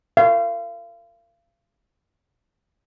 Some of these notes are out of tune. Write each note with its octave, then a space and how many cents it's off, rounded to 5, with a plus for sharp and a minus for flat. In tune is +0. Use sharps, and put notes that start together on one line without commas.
F5 -35